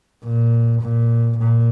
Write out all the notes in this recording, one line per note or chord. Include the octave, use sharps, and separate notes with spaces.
A#2
A#2
A#2